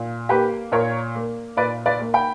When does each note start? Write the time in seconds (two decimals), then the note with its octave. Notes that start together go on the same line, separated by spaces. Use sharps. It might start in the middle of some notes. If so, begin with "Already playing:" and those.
Already playing: A#2
0.29 A#3 G4 B4
0.72 A#2 A#4 C#5
1.15 A#3
1.57 A#2 B4 D5
1.86 B4 D5
2.00 A#3
2.14 G5 B5